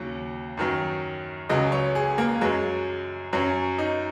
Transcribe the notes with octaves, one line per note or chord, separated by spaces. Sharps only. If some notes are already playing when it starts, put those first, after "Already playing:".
Already playing: D#2 C#3 F#3
F#2 D#3 F#3
C#2 C#3 F#3 D#5
C#5
G#4
A#3
F#2 F#3 G#3
F#2 F#3 C#4
D#4